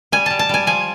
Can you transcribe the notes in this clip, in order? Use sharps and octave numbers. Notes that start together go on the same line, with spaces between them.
G3 G#5
G3 A5
A5
G3 G#5
F3 G#5